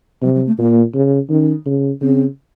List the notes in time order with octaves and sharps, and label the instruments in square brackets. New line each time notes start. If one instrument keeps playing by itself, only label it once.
[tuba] C3 [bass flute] F#3
[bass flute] F#3
A3
[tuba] A#2 [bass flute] A#3
[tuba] C#3
[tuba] D#3 [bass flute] C#4
[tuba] C#3
[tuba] C#3 [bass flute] C4